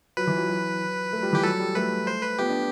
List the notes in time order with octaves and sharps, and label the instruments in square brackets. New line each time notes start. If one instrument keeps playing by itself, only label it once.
[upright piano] F#3 [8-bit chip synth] B4
[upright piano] E3
F#3
F#3
A3
G3
[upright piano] E3 [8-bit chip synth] G4
[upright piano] F#3 [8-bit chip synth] A4
[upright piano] G3
[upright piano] A3 [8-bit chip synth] B4
[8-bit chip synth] C5
B4
[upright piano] B3 [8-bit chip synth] G4
[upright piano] D4